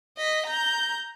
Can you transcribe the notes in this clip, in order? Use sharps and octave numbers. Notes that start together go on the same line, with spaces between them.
D#5 B6
A#5 G6